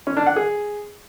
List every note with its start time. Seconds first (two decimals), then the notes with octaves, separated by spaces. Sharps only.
0.07 C#4
0.17 D4
0.26 F#5
0.36 G#4